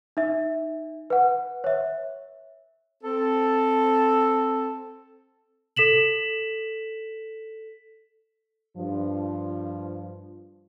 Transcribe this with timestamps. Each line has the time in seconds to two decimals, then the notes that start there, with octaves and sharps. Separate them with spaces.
0.17 D#4 E5
1.10 B4 F#5
1.64 C#5 E5
3.03 C4 A4
5.76 A4 B6 E7 F#7
8.77 G2 F3